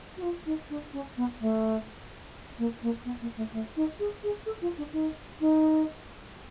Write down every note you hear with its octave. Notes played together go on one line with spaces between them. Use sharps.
F#4
F4
D#4
D4
C#4
B3
A3
A#3
A#3
B3
A#3
A3
A3
D#4
G#4
G#4
A4
F4
D4
D#4
D#4